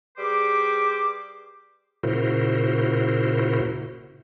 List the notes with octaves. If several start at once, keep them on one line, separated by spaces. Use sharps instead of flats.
G3 G#4 B4 C5 D6
A#2 C#3 E4 F#4 A#4 C5